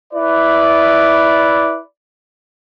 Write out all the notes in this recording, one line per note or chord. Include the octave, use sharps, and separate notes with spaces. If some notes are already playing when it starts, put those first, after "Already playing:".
E4 B4 D5